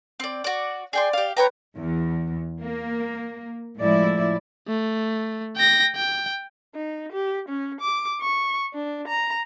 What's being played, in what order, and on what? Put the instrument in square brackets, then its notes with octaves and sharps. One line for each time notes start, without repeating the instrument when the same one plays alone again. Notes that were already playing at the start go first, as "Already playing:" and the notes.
[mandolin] C4 D5
F#4 D5
[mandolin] G#4 G5 C6 [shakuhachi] D5
[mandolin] G4 F5
[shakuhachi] B4 [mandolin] C#5 G5 A#5
[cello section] E2
A#3
A2 F3 G#3 E4 D5
[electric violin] A3
G5 A#6
G5
[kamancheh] D#4
G4
C#4
D6
C#6
D4
A#5